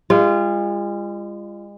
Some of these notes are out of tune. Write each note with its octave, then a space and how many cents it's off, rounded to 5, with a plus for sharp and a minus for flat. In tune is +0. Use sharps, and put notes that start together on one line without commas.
G#3 -40 F4 -25